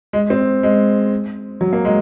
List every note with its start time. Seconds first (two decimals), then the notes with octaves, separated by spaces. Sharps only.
0.13 G#3
0.30 C4
0.63 G#3
1.61 F#3
1.73 A#3
1.85 G#3